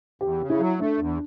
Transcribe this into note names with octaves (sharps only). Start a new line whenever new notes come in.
E2 G4
C#3
E4
F#3
A3 D4
E2